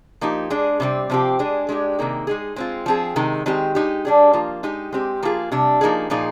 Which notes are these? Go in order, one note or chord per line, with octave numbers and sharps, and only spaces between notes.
F3 A#3 D#4 G4
G#3 D4 G#4
C3 G3 C4
C3 F3 C4 G4
G#3 D4 G#4
G#3 D4 G4
C3 D#3 A#3 D#4 G#4
G#3 D#4 G#4
G#3 C4 F4
F3 C4 F4 G#4
C3 D#3 G#3
D#3 G#3 C4 G4
G#3 D#4 G4
G3 D4 G#4
F3 A#3 F4
G#3 D#4 G4
G#3 C4 G4
F3 A#3 F4 G#4
C3 G3 D4
F3 A#3 D#4 G#4
A#2 F3 A#3 D#4 G#4